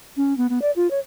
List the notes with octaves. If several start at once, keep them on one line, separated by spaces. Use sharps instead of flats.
C#4
B3
B3
D5
F4
C#5